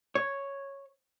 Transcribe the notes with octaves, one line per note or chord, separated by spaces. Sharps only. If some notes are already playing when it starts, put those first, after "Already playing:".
C#5